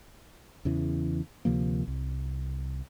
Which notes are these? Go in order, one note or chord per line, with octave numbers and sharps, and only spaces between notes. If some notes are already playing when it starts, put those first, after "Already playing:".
E2 C#3 E3
D2 C3 F3 A#3
C2